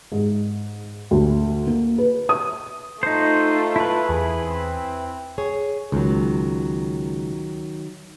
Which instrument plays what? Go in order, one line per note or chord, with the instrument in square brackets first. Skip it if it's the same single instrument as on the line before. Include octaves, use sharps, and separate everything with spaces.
[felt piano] G#2
D2
A#3
B4
D#6
[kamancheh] A3 F4 [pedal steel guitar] D#4 C5
[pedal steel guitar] E4 B4
[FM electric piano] E2 [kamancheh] G#4
[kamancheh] C4
[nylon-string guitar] G#4 C#5
[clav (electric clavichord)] C#2 [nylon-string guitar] D#3 F#3